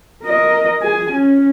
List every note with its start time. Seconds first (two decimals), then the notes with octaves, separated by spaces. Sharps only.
0.24 A#4 D#5
0.82 G#4 G#5
1.12 C#4